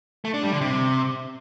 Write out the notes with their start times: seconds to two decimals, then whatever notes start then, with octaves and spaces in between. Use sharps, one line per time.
0.25 A3
0.34 D4
0.43 G3
0.52 D3
0.61 C3